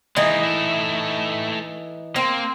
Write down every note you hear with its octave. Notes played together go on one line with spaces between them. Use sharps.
E3 G#3 A#3 D#4
A3 E4
A#3 C4